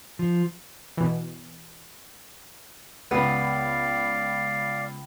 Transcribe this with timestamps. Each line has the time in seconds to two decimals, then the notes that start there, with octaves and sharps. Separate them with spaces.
0.19 F3
0.97 B2 E3
3.11 C#2 B3 D5 F5